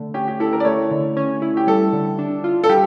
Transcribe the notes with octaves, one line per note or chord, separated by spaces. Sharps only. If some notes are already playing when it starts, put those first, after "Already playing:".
Already playing: D3 A3
C#4 G4
G4
E4 A4
A#4
D5
A3 C#5
D3
C#4
E4
G4
G3 A4
D3
D4
F4
A4
G3 G4